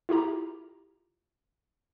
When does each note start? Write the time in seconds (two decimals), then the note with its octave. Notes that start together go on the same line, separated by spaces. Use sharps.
0.09 E4 F4 G4 A#5